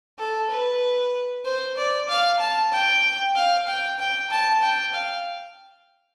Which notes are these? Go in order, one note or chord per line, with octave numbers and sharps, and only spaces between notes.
A4
B4
C5
D5
F5
A5
G5
F5
G5
G5
A5
G5
F5